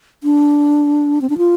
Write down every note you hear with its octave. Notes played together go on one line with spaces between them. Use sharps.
D4
C4
D4
F4